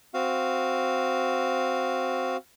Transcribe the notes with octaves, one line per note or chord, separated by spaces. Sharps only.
C4 F#4 F5